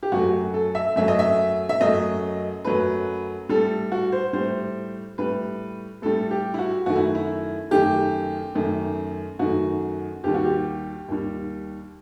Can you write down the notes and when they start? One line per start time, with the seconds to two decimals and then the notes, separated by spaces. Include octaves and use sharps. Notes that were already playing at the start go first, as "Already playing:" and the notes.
0.03 G4
0.12 F#2 F#3 A3 F#4
0.54 A4
0.75 E5
0.96 F#2 F#3 A3 E5
1.08 D#5
1.19 E5
1.69 E5
1.81 F#2 F#3 A3 D#5
2.65 F#2 F#3 A3 B4
3.49 A2 G3 A4
3.92 F#4
4.12 C5
4.33 A2 G3 C5
5.18 A2 G3 B4
6.02 A2 G3 A4
6.31 G4
6.54 E4
6.59 F#4
6.86 F#2 D#3 A3 F#4
6.96 E4
7.15 E4
7.71 F#2 D#3 A3 G4
8.55 F#2 D#3 A3
9.39 F#2 D#3 A3 F#4
10.24 D#2 D#3 G3 G4
10.34 F#4
10.44 G4
11.08 D#2 D#3 G3